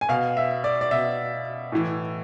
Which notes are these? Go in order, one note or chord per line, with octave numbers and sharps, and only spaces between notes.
G#5
B2 F5
E5
D5
D5
B2 E5
A2 E3